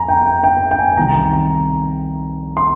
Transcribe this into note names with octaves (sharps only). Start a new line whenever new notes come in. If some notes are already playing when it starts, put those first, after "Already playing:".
Already playing: F2 G#5 A#5
G5
G5
G5
G5
G#5
C2 C3 D#3 A#5
A#5
C6